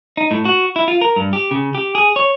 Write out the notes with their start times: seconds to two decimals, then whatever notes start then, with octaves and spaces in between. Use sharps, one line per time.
0.17 D#4
0.31 A2
0.45 F#4
0.76 E4
0.88 F4
1.01 A#4
1.16 G2
1.33 G4
1.51 C#3
1.75 G4
1.95 G#4
2.16 C#5